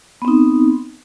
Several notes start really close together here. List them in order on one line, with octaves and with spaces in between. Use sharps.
B3 C4 D#4